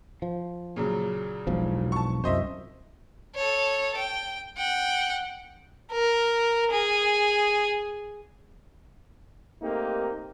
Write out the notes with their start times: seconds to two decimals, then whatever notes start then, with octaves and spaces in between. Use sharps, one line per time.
0.22 F3
0.76 A#2 C#3 F#3
1.47 E1 B1 F3
1.92 A5 C#6
2.24 C2 F#2 C5 D#5 E5
3.35 A4 C#5
3.97 G5
4.58 F#5 G5
5.92 A#4
6.71 G#4
9.62 A3 A#3 C4 D#4 G4 A#4